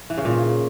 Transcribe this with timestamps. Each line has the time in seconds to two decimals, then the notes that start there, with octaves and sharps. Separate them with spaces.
0.10 E3
0.18 C#3
0.25 A#2